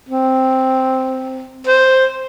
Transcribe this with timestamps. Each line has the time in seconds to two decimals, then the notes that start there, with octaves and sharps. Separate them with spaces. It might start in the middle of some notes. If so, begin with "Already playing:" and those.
0.09 C4
1.67 C5